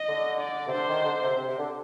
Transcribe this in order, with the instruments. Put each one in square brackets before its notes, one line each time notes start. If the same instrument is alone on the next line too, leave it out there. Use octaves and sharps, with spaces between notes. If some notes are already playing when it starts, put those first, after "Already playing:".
Already playing: [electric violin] D#5
[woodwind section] D3
[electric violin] D5
[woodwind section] C3
[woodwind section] D3 [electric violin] C5
[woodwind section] D#3
D3
C3
C3
C3
D3